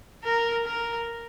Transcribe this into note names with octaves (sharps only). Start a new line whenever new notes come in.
A#4
A#4